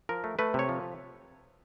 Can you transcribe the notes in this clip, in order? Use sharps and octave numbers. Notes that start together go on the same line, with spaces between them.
F3 A#4
A3
A3 B4
C3 C#5
F3